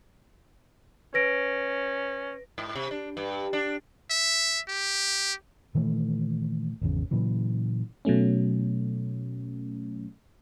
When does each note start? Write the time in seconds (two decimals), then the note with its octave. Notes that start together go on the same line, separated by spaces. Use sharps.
1.14 C#4 B4 A#6 D7
2.58 G#2
2.75 C3
2.91 D4
3.17 G2
3.53 D4
4.10 E5
4.68 G4
5.75 A#2 D#3 E3 A3
6.81 G#1 E2 C#3
7.11 A#2 C#3 E3 F#3
8.05 B2 F#3 A3 C#4